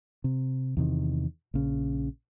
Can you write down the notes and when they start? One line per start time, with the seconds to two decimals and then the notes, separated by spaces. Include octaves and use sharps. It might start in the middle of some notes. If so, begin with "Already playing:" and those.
0.24 C3
0.77 E2 C3 D#3
1.54 A#1 C#3